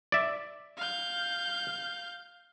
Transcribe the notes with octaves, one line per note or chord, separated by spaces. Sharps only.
D5 E5
F5 G6